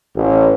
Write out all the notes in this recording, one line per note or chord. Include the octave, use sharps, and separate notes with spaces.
A1